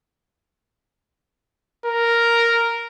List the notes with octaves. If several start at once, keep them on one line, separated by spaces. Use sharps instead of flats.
A#4